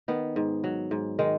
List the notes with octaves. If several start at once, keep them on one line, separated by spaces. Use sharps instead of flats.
D#3 B3
G#2
F#3
G#2
D#3 G#3